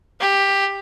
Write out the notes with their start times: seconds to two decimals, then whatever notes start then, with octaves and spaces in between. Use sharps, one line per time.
0.20 G4